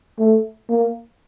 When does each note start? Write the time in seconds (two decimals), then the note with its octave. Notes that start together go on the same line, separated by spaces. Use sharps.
0.19 A3
0.69 A#3